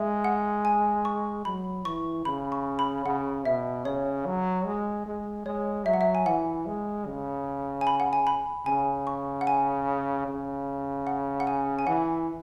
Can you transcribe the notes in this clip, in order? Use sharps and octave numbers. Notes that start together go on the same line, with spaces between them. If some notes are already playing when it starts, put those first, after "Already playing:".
Already playing: G#3 E5
F#5
G#5
C#6
F#3 B5
E3 C#6
C#3 B5
C#6
B5
C#3 F#5
B2 E5
C#3 C#5
F#3
G#3
G#3
G#3 C#5
F#3 E5
F#5
E5
G#5
E3 F#5
G#3
C#3
G#5
B5
F#5
G#5
B5
C#3 G#5
C#6
F#5
G#5
C#3
F#5
F#5
G#5
G#5
E3 F#5